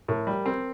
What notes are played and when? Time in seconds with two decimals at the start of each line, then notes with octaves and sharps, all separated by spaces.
0.08 A2 A#4
0.27 G3
0.45 C4 A#4